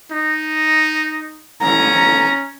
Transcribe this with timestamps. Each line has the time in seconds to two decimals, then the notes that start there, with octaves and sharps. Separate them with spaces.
0.11 D#4
1.63 C#4 A#5